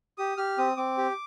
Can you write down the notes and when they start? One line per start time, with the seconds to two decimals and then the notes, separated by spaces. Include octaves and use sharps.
0.18 G4 D#6
0.37 G4 F6
0.58 C4 D#6
0.77 C4 D6
0.98 G4